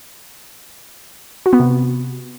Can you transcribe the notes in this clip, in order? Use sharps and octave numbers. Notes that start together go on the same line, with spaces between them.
F#4
B3
C3